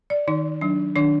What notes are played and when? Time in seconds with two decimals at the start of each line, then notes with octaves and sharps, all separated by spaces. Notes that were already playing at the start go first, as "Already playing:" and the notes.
0.10 D5
0.28 D#3 D#4
0.61 F#3 D4
0.96 D#3 D4